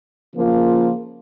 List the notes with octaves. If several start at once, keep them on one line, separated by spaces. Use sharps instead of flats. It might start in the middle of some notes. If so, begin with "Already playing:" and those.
C#3 F3 A#3 F4